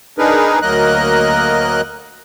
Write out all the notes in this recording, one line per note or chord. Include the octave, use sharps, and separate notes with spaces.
D4 D#4 G#4 A#4 B4
D2 F#3 A#3 A#4 D#5 F#6